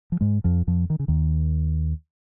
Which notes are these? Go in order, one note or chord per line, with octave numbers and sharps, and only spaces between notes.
F3
G#2 G#3
F2 F3
F2 F3
D#3
C#3
D#2 D#3